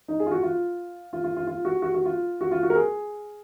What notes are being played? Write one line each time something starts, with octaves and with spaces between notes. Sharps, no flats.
D#4
G#4
F4
F#4
F4
F4
F4
F4
F4
F#4
F#4
F#4
F4
F#4
F4
F#4
A#4
G#4